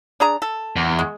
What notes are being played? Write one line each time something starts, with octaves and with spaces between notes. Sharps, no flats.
D4 G#4 A#5
A4
E2
G#3